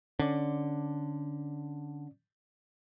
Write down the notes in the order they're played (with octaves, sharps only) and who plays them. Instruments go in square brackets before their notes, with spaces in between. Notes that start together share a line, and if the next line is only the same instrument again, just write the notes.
[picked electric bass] D3 [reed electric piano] C#4 D5